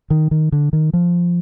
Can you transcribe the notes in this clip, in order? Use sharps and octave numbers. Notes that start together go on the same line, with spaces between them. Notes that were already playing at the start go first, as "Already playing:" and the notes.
D#3
D#3
D3
D#3
F3